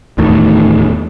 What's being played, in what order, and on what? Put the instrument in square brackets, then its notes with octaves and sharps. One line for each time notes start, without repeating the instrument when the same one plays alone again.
[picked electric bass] D1 E2 D#3 A3